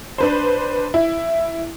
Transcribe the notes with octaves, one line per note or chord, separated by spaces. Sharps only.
D4 B4 C5
E4